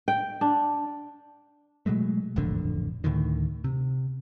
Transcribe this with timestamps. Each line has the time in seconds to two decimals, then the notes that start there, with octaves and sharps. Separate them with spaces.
0.08 G5
0.41 D4
1.86 B2 F#3 G#3 A3
2.36 D#1 A1 F2 D3
3.04 D2 A2 D3 D#3
3.64 C3